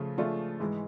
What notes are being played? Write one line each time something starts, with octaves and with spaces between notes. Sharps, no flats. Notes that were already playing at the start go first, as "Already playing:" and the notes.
Already playing: C#3 F3 A3 F4
C#3 F3 A3 D4 F4
G#2 E3 G#3